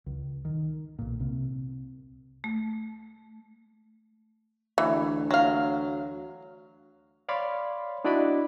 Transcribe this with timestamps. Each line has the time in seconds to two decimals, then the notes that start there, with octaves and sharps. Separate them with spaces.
0.06 C#2
0.45 D#3
0.99 B1 A#2
1.20 C2 C3
2.44 A3
4.78 D2 E3
5.31 F#3 F5
7.29 C#5 D5 F5 B5 C6
8.05 D4 E4 F#4 D5 D#5 B5